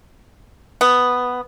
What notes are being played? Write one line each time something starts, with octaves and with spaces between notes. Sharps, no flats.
B3